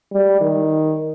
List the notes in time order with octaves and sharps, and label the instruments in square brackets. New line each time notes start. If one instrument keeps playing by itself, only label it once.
[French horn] G3
D#3